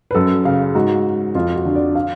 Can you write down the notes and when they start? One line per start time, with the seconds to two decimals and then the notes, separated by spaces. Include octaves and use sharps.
0.11 B4
0.15 F#2 A4
0.45 C#3 F5
0.75 G#2 F#4
1.35 F2 F4
1.55 F#4
1.65 D3
1.75 D5
1.96 F5